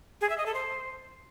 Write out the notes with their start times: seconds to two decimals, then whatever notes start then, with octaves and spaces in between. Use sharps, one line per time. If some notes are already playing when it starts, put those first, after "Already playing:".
0.21 G#4
0.30 E5
0.38 D#5
0.46 A4
0.54 C5